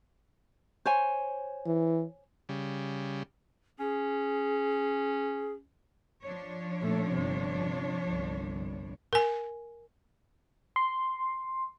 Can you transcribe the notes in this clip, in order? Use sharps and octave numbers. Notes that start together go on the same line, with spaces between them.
C5 C#5 G#5
E3
C#3 G3
C#4 G#4
F3 D4 C#5
A#2 A3
G1 C3
C3
G1 C2
A#4 G#5
C6